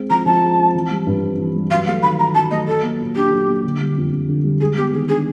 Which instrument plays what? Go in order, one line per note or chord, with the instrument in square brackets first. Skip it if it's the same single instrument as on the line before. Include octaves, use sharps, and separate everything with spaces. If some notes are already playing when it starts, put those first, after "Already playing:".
Already playing: [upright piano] G#3 C4
[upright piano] F3 [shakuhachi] A#5
[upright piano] F3 [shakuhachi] A5
[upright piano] G#3
C4
E3
G3
G2
C4
E3
G3
[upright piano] F#3 [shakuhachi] F5
[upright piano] A3 [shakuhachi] F5
[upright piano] D#3 [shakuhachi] B5
[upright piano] D#3 [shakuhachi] A#5
[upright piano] F#3 [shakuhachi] A5
[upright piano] A3 [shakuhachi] D#5
[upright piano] F#3 [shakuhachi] A4
[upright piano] A#3
A#2
[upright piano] D4 [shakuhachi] G4
[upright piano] F#3
A#3
D3
G3
F2
F2
D3
G3
[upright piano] G#3 [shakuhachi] G#4
[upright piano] B3 [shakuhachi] G4
[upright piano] D#3 [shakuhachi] G#4
[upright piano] D4 [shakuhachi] G#4